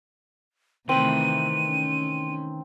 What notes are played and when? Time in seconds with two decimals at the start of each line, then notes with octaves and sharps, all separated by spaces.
0.89 C3 D#3 E3 A3 C4 B4 D#7
1.65 C#4